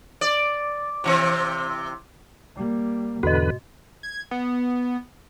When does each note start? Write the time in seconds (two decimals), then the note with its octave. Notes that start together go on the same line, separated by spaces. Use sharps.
0.21 D5
1.04 C3 E3 C4
2.56 G3 A#3
3.23 E2 G#2 B2 D3 F#4 B4 D#5
4.03 G#6
4.31 B3